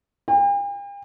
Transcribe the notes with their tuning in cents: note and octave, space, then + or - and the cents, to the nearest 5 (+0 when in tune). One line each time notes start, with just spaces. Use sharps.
G5 +45